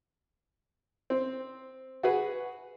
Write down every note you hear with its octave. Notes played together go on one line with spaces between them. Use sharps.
C4
F#4 G#4 B4